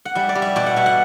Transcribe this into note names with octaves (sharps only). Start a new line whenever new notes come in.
F#5
G3 E5
D5
G3
E5
B2 D5
F#5
B2 E5
F#5